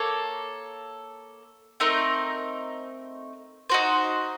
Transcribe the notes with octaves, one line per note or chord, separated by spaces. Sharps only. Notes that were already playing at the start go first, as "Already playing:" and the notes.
Already playing: A#3 A4 C#5
A3 C4 D#4 A#4
D#4 F#4 C5